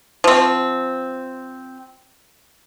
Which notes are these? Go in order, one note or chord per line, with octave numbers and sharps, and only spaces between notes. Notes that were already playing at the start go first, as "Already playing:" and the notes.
F3 C4